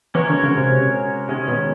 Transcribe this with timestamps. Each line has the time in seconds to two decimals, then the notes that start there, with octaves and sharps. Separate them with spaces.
0.15 E3 G#3 C#4 F#4 A#4 C#5
0.29 D3
0.43 C#3
0.58 C3
1.29 C3 D#3 G#3 C#4
1.48 B2